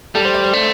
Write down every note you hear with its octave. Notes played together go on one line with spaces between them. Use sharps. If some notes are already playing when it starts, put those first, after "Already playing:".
G3 A4
C5
D5
C5
A3